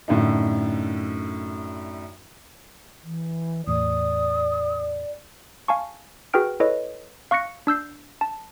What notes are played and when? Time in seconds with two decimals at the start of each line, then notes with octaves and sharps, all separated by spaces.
0.08 F#2 A2 D3 D#4
3.04 E3
3.67 E2 A2 D5 D#6
5.68 F5 G#5 A5 C#6
6.33 F#4 G#4 B4 G5 F6 D7
6.60 E4 A4 B4 C#5 D#5
7.31 F5 C#6 F#6 A#6 C#7
7.67 D4 E6 G6 C7
8.21 A5